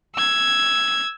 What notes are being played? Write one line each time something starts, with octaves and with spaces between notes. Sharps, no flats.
E6 G#6